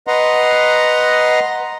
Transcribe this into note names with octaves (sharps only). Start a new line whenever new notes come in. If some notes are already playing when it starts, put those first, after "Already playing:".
B4 D#5 F#5 A#5 C6